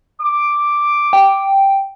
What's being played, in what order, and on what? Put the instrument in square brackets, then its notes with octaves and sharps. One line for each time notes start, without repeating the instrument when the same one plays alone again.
[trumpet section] D6
[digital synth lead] G5